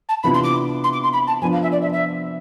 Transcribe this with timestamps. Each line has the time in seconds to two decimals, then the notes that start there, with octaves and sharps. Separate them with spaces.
0.08 A5
0.23 C3 E3 B3 D4 F4 B5
0.34 C6
0.43 D6
0.83 C6
0.93 D6
1.03 C6
1.13 B5
1.27 A5
1.42 F3 B3 D4 F4 G#5
1.52 F5
1.62 E5
1.72 D5
1.81 E5
1.92 E5